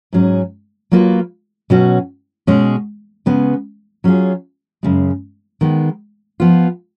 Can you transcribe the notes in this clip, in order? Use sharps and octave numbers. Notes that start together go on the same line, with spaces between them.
G#2 F#3 C#4 G#4
F#3 A#3 F4 B4
B2 F#3 C#4 F#4
B2 G#3 C#4 G#4
C#3 G#3 B3
F#3 C#4 F4 G#4
F#2 C#3 G#3
D#3 G#3 B3
F3 B3 F4